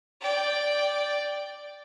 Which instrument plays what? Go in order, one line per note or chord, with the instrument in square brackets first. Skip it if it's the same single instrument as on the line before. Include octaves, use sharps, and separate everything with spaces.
[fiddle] D5 G5